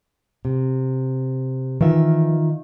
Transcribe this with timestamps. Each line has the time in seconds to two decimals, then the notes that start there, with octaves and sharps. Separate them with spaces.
0.45 C3
1.81 D#3 E3 F4 E5